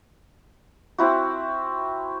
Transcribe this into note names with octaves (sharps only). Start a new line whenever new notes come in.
C4 E4 F#4